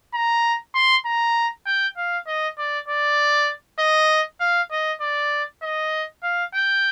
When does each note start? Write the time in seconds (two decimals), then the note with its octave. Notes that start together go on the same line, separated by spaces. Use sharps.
0.14 A#5
0.75 C6
1.06 A#5
1.66 G5
1.97 F5
2.27 D#5
2.58 D5
2.88 D5
3.79 D#5
4.41 F5
4.71 D#5
5.01 D5
5.63 D#5
6.23 F5
6.54 G5